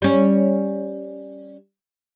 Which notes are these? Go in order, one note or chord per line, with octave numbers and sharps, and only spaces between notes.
G3 C#4